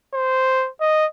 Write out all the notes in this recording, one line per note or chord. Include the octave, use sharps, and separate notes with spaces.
C5
D#5